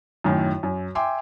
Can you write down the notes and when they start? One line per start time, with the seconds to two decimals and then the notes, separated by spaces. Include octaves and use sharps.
0.24 F#2 A2 D#3
0.63 F#2
0.95 E5 G5 G#5 C6 D6